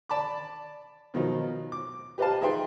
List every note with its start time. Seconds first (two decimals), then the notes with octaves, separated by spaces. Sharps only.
0.09 D5 A5 B5 D6
1.14 B2 D#3 F3 F#3 D#4
1.72 D6
2.18 G4 B4 C5 D#5 F5 A5
2.41 D#4 G#4 B4 E5 G5 C6